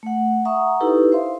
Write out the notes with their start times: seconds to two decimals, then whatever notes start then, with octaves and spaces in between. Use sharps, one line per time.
0.03 A3 F#5
0.45 E5 F#5 A#5 C#6 D#6
0.80 D#4 E4 G4 A4 B4
1.12 C5 E5 F5 C6